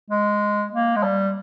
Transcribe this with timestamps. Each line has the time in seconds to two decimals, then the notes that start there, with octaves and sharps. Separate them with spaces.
0.10 G#3
0.72 A#3
0.96 G#3
1.03 G3